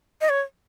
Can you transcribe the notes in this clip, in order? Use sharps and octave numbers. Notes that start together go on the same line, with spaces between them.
D#5
C#5